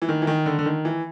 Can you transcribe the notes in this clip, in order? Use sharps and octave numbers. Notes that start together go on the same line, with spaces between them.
E3
D#3
E3
D#3
D3
D3
D#3
E3